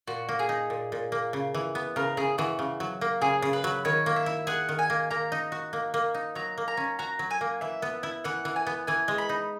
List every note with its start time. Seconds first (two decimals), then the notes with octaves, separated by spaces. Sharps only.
0.07 A#2 F#4
0.29 A#3
0.39 G#4
0.49 D#4
0.70 A#2
0.92 A#2
1.12 A#3
1.33 C#3
1.54 E3
1.75 B3
1.96 C#3 A#4
2.17 C#3 G#4
2.38 E3 F#4
2.59 C#3
2.80 F#3
3.01 A#3
3.22 C#3 G#4
3.42 C#3
3.53 B4
3.64 F#3
3.85 D#3 C#5
4.06 A#3
4.16 E5
4.26 E4
4.47 G#4 F#5
4.69 D#3
4.79 G#5
4.90 A#3
5.10 A#3 A#5
5.32 D#4
5.52 F#4
5.73 A#3
5.94 A#3
6.14 D#4
6.35 F#3 A#5
6.58 A#3
6.68 A#5
6.77 C#4
6.99 F#4 A#5
7.19 F#3
7.31 G#5
7.41 A#3
7.61 E3 E5
7.82 B3
8.03 E4
8.24 E3 F#5
8.45 E3
8.56 G#5
8.67 B3
8.87 E3 G#5
9.08 G#3
9.18 B5
9.29 D#4